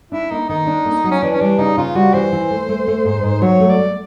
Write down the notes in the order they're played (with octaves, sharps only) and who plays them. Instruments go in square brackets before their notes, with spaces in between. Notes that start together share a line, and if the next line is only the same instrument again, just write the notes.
[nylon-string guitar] D4 [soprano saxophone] E4
[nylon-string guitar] A#3 [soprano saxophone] D#4
[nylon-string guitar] D#3 [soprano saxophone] D#4
[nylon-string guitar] D4
A#3
F#3
[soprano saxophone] C#4
[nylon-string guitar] E3 [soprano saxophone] D4
[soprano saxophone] C#4
[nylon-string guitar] G3 [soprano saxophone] D4
[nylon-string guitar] C#3 [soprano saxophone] D#4
[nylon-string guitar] C#3 [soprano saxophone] F4
[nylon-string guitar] G3 [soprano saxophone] F#4
[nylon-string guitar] E3 [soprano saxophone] C5
[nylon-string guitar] E3
A3
A3
A3
G#2
G#2
[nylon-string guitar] F#3 [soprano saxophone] C#5
[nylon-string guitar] A3
[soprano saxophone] D5
[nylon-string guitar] A3